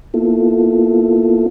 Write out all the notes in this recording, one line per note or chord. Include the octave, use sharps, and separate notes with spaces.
A#3 B3 E4 F4 A4